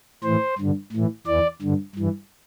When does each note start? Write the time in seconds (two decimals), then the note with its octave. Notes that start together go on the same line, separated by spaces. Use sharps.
0.24 A2 E3 C5
0.58 G2 D3
0.92 A2 E3
1.27 E2 E3 D5
1.62 G2 D3
1.95 G2 E3